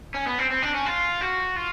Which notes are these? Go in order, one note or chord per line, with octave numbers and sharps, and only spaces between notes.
C#4
B3
C4
C4
D4
C#4
F4
F#4
F4